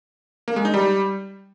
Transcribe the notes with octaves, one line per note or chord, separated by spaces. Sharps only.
A#3
G#3
D#4
G3